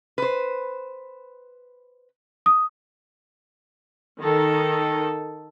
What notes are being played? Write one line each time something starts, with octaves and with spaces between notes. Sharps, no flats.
B4 C5
D#6
D#3 A4